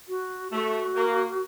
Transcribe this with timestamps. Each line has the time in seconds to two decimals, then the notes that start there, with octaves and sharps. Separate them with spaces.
0.09 F#4
0.52 A3 F#4
0.95 A#3